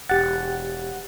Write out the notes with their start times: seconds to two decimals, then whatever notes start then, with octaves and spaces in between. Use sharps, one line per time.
0.09 E1 G4 F#5 A6